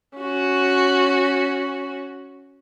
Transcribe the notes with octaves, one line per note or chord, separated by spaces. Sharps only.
C#4 F#4